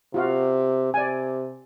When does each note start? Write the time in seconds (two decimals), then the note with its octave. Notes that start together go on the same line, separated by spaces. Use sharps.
0.14 C3 F4 F#4 F5
0.94 C3 D5 G#5